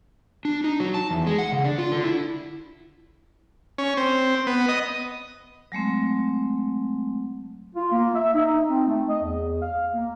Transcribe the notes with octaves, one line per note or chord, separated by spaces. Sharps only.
D4
D#4
F#3
A5
E2
G#3
F#5
C#3
D4
F4
D3
E4
C#4
C4
B3
D#5
F#3 G#3 A3 C4
F4
A#3
E5
D#4
C4
A3
D#5
E2
F5
A#3